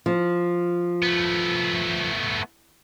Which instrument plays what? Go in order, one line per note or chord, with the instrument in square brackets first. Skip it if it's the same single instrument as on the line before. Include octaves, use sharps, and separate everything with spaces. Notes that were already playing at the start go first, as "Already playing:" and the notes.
[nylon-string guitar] F3
[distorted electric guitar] A3 B3